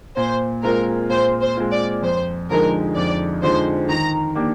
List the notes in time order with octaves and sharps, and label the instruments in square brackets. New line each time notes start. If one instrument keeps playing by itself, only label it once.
[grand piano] A#2 [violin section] C5
[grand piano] G#3 C4 F4 [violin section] A#4
[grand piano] A#2 [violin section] C5
[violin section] C5
[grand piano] G#3 C4 F4
[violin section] D5
[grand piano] F2 [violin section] C5
[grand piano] D3 F3 G#3 D#4 [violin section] A#4
[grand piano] F2 [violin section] D5
[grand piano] D3 F3 G#3 D#4 [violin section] C5
[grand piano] D#3 [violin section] A#5
[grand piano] A#3 D4 G4